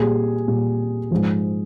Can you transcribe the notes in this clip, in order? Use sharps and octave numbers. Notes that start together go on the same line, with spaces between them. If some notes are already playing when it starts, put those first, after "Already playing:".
Already playing: A#2 G3 G#4
A#2 G3
G#2 F3